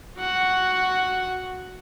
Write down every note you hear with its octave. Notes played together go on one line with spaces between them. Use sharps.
F#4 F#5